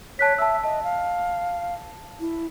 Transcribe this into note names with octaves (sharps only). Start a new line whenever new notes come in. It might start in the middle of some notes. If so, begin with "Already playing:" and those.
C#5 A5 F#6 B6
E5 A5 E6
D#5 A5
F5
E4